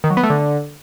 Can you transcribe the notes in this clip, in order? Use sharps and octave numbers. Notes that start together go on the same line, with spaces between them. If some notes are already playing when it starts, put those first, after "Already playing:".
D#3
F#3
B3
A3
D3